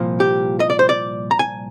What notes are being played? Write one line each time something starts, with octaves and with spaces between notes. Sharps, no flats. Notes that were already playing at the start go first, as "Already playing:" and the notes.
Already playing: C2 A#2 F3
G4
D#5
D5
C5
D5
A#5
G#5